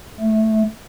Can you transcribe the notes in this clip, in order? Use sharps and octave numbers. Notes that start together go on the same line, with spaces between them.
A3